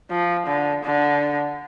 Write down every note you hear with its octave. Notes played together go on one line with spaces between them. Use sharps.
F3
D3
D3